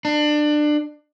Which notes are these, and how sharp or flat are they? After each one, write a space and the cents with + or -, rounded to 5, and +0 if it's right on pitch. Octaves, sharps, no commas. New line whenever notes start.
D4 +25